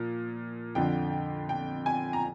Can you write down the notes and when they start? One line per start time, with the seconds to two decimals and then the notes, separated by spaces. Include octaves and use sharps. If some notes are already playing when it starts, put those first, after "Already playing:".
Already playing: A#2 F3
0.75 F2 D3 F3 G5
1.49 G5
1.86 G#5
2.13 A#5